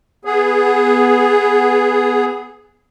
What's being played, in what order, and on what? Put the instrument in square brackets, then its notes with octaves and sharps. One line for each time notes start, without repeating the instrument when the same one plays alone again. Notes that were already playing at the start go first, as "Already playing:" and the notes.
[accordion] B3 G#4